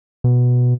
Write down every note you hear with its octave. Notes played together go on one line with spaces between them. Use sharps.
B2